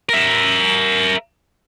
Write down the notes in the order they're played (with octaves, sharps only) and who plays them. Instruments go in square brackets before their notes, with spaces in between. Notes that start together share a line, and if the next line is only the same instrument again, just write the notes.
[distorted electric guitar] A#4 E5